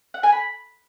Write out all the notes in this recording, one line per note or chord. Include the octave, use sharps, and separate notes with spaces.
F#5
G#5
B5